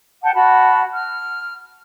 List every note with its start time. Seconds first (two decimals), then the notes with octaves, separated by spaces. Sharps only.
0.22 F#5 G5 A5
0.33 F#4 A5 B5
0.93 F6